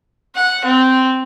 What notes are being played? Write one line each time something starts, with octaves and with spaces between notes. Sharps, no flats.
F#5
C4